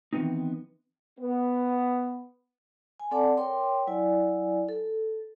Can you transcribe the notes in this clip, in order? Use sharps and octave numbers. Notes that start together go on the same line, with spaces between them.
D#3 E3 F#3 B3 C4 D#4
B3
G#5
C4 A4 D5 F#5 A5 D6
A#4 C#5 G5 C6 D6
F#3 E4 D5 G#5
A4